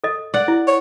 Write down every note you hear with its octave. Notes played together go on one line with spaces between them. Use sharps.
A4 D#5
D5 F#5
E4
C#5